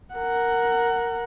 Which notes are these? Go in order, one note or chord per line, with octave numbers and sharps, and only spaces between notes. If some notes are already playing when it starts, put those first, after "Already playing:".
A#4 F#5